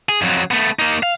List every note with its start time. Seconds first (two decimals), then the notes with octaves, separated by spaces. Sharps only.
0.09 G#4
0.21 F2 F#3
0.51 A3 B3
0.79 A#3 D#4
1.03 F5